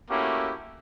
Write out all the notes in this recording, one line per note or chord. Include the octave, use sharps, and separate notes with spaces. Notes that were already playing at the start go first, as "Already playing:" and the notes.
A3 A#3 C#4 E4 F#4 G4